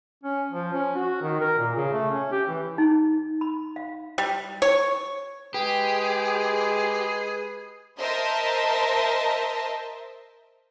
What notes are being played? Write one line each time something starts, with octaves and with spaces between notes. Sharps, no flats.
C#4
F3
C#4
F#4
D#3
A#4
A#2
C#3
A3
C#4
G4
E3
D#4
B5
F5
G3
C#5
G#3 G4 G#4 B4
A#4 C5 D#5 E5 A5